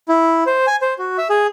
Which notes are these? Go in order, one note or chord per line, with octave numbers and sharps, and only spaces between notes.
E4
C5
G#5
C5
F#4
E5
G#4